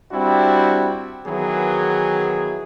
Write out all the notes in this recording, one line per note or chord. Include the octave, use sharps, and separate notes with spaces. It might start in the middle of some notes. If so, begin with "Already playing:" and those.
G3 C4 D4 E4 F#4
D#3 E3 F#3 B3 G#4